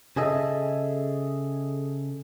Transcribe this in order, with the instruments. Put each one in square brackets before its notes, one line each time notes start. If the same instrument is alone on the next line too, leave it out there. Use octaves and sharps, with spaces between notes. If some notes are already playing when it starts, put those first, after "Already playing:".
[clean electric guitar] C#3 G#4 A4 D#5 E5